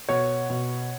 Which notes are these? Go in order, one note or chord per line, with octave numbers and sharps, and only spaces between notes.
B2 C#5
B2